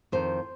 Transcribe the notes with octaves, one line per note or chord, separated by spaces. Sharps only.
F2 D#3 C5